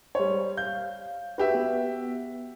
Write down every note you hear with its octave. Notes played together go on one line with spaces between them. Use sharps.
G3 C5 C#5
F5 G6
F#4 G4 B4 E5
B3